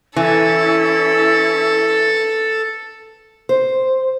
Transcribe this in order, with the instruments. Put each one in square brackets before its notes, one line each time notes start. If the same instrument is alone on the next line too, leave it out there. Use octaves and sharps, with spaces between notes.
[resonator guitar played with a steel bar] E3 [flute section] C#4 E4 [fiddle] A4
[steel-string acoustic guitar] C5